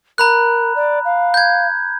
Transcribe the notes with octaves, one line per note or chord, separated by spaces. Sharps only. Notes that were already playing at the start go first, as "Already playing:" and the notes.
A#4 A#5 B5 F#6
D5
F5
G6 G#6